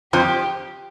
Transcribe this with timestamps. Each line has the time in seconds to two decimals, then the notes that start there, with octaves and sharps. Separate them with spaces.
0.13 F2 F3 G4